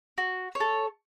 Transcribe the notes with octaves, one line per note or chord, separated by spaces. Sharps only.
F#4
C#5
A4